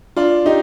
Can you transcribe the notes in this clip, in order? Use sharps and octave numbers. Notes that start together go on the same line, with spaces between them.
D4 F4
D#4 G4